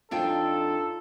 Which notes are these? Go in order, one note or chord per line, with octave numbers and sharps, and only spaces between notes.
F2 D4 D#4 F4 A4 A#4 G5